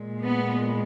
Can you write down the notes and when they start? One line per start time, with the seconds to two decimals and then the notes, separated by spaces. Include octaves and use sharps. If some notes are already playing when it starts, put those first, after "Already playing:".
Already playing: A#2 G#3
0.23 B3